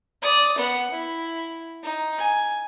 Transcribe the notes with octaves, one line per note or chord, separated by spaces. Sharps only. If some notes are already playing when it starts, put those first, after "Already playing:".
D5 D#6
B3 F#5
E4
D#4
G#5